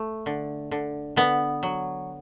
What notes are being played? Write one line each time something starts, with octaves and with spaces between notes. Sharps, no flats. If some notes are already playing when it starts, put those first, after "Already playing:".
Already playing: A3
D3
D3
D3 B3
F#3